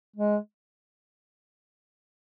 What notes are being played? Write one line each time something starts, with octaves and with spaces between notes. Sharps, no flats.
G#3